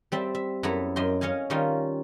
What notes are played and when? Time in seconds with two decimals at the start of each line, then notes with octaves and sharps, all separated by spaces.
0.12 G3 C4 E5 A5
0.35 E5
0.63 F#2 B3 E4 A4 E5 A#5
0.96 F#2 D#5 G5 C6
1.21 C#4 C#5 D#5 F5 G#5
1.50 D#3 G3 C#4 D#4 F4